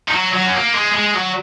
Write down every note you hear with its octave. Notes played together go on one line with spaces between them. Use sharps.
D#3
F#3
F#3
C#4
A#3
G#3
G#3
F#3